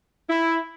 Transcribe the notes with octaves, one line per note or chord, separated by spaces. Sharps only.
E4